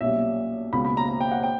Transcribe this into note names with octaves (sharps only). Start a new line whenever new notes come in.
B1 A#2 G3 C#4 E5
C#2 B2 A#3 B5
B5
A#5
A#5
G5
F#5
G5